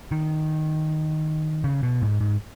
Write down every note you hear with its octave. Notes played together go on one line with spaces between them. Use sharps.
D#3
C#3
B2
G#2
G#2